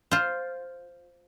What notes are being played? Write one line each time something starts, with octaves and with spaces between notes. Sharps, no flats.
F4 C5